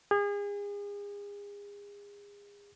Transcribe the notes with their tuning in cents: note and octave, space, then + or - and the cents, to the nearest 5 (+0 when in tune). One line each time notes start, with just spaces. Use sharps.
G#4 -35